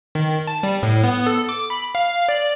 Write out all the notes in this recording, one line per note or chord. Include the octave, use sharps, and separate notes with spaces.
D#3
A5
G3
A2
B3
A4
D6
B5
F5
D5